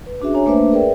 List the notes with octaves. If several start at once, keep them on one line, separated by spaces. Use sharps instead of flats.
B4
C#4 D4 F#4 G#4 E5
D4 C#5 G#5 A#5
A3 A#3 D4 B4 C5 E5
G#4 A#4 B4 D5 E5 G5